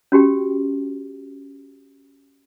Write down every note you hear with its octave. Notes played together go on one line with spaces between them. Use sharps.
C#4 F#4 G4 G5